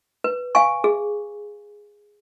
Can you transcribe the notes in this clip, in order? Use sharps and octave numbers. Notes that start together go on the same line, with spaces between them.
B4
F5 G#5 C#6
G#4